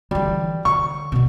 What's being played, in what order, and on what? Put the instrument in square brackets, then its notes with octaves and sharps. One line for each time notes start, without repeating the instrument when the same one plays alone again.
[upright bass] D3 E3 [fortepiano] G3
[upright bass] D3 [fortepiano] C#6
[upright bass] B2 D3